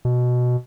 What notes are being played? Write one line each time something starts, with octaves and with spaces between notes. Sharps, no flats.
B2